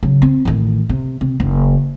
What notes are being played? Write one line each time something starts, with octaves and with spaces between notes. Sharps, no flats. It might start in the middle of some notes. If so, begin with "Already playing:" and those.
C#3 F#3
C4
A1 D#3
C3
C3
F#1